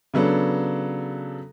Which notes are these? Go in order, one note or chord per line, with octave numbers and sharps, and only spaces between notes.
C#3 F#3 B3 D4 A4